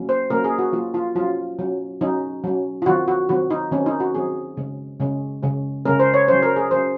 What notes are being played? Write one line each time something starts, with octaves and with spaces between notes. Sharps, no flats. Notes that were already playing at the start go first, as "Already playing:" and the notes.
Already playing: F#3 A#3 C#4
C5
F#3 A#3 C#4 A#4
G#4
F#4
F#3 A#3 C#4 F4
F4
F#3 C#4 F4
F#3 C#4
F#3 C#4 D#4
F#3 C#4
F4
D#3 F#3 C4 F#4
F#4
D#3 F#3 C4 F#4
D#4
D#3 F#3 C4 C#4
D#4
F#4
D#3 F#3 C4 G#4
C#3 G#3 C#4
C#3 G#3 C#4
C#3 G#3 C#4
C#3 G#3 C#4 A#4
C5
C#5
F#3 C#4 C5
A#4
G#4
F#3 C#4 C5